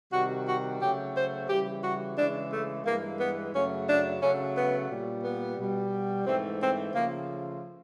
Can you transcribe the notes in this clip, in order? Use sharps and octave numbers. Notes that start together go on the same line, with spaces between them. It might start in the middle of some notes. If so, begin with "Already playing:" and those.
C3 D#3 G3 F#4
F#4
C#3 F#3 A3 G4
C5
C#3 E3 G3 G4
F#4
C#3 E3 G#3 D4
A3
G2 E3 G#3 A#3
B3
F#2 C#3 F#3 A3 C#4
D4
C#3 F#3 A3 C#4
B3
A#2 G3
B3
B2 G3
G#2 E3 A3 C4
C4
C#3 F3 A3 A#3